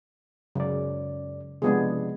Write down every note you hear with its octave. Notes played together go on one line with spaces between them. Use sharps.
F#2 C#3 D5
C3 F3 G#3 B3 D4 G#4